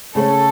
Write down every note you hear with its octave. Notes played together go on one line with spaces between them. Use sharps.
C#3 A3 C#4 A4